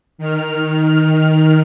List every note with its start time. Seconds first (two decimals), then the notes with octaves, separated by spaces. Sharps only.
0.18 D#3 F6